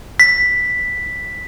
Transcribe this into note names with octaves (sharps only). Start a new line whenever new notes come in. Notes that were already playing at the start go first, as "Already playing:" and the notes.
B6